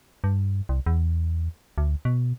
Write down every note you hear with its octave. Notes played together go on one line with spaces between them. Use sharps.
G2
C2
E2
D2
B2